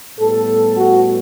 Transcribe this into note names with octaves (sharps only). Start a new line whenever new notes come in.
A2 G3 B3 A4
F#4